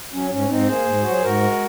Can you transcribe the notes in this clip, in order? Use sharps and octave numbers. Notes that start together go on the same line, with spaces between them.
F#3 C#4
G#2 C#4
G#2 C4 D#4
A#3 G#4 C5
G#2
F#3 F#4
G#4
G#2 F#4 A#4
G#3